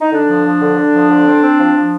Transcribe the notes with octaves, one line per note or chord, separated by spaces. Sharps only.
D#4
D3 D4
F3
F3
D3
D3
F3
D3
C4
C4
F3
F3